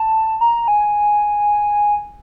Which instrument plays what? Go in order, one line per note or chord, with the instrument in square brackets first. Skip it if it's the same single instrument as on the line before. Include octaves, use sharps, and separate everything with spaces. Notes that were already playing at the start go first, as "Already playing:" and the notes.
Already playing: [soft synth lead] A5
A#5
G#5